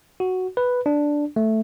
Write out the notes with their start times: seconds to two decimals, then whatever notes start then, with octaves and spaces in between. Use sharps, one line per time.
0.20 F#4
0.57 B4
0.86 D4
1.36 A3